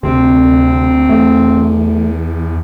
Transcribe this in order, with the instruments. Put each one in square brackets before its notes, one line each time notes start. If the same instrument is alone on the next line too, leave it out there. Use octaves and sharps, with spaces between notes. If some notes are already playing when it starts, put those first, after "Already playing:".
[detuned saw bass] D2 [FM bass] C3 [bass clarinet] C4
[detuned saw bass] E2 [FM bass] A3